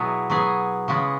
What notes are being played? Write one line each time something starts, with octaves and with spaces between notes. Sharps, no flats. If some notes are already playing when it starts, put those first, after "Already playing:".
Already playing: B2 F#3 B3 E4 G#4
F#3 B3 G#4
C#3 G#3 B3